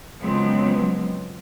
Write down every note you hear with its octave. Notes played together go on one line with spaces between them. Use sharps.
C#3 F3 F#3 G#3 B3 C4